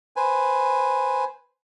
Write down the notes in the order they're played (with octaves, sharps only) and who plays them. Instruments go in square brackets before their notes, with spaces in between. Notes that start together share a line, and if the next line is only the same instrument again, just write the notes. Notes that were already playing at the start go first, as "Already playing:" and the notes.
[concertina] B4 C5 G#5